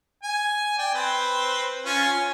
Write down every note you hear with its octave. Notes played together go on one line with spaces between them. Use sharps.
G#5
D5 G5
C4 B4 C5
C#4 F4 G#5
G#5